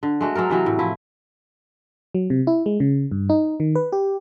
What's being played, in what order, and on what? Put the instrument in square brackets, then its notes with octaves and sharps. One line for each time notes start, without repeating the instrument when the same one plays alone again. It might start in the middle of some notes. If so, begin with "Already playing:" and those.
[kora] D3
G#3 A3 F#4
F#3 G#3 A4 A#4
C3 E3 F#3 F#4
A2
F3 E4
[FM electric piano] F#3
C3
E4
G#3
C#3
G2
D#4
D#3
B4
G4